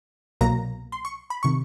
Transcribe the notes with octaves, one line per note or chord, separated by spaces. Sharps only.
C2 B2 F#3 A#3 A#5
C6
C#6
B5
C3 D#3 C#6